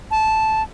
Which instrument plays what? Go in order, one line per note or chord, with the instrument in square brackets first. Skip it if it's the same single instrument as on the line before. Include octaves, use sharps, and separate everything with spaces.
[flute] A5